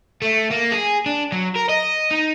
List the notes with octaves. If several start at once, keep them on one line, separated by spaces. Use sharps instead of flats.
A3
A#3
G#4
D4
F#3
A#4
D#5
D#4